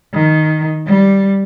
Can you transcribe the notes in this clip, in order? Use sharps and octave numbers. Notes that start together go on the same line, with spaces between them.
D#3
G3